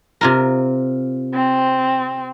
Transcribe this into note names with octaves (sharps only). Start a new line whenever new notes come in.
C3 F4 A#4
C4